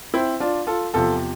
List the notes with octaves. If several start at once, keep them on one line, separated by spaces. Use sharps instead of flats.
C4 E4
D4 F4
F4 A4
E2 C3 F3 F4 A4